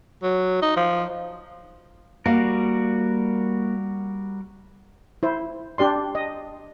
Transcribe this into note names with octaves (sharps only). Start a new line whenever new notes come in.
F#3
D#4
F3
G3 A#3 F#4 A#4 F5
E4 C5
D4 G4 D5 C6
D#5